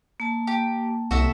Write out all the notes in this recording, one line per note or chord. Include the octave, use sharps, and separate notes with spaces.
A#3 A5
G4
C2 F#4 A4 E5